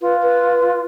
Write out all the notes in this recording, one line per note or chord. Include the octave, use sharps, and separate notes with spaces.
F4 B4
B4